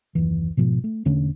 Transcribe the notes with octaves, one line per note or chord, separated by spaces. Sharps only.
F#1 D#2 E3
G#2 B2 F3
A3
E1 D3 A3 C#4